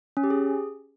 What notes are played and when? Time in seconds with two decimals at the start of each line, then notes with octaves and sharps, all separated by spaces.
0.17 C#4
0.24 G4
0.30 G#4